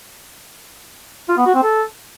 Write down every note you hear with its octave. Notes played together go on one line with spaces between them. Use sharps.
F4
B3
F#4
C4
A4